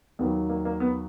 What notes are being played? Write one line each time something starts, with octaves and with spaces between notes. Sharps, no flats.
D#2 D#3 F#3 B3
A#3
A#3
B3